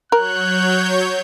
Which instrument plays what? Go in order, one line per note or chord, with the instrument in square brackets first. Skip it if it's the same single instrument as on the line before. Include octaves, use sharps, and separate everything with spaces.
[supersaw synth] F#3 C#5 G6 [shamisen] A#4 [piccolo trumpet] F#6